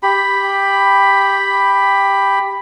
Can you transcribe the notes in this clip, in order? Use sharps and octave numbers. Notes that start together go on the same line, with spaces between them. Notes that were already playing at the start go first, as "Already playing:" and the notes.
G4 B5